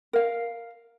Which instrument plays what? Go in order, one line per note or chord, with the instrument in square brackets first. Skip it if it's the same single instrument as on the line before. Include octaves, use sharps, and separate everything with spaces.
[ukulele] A#4 F5